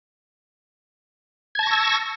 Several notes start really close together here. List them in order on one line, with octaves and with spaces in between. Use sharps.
G#6 A5 A#6 C#6 E6